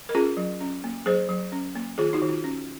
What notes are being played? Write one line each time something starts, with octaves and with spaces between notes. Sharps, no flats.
A#4
C#4 F4 G#4
F#3
C#4
A#3
F#3 G#4 C5
F#3
C#4
A#3
D#3 F4 G#4
D#4 F#4
D#3
F4
C#4